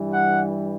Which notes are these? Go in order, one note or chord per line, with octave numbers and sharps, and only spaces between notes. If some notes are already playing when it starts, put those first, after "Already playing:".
Already playing: G2 E3 G3
F#5